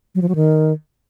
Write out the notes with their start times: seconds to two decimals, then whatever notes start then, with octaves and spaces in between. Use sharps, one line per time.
0.15 F#3
0.22 F3
0.29 F#3
0.35 D#3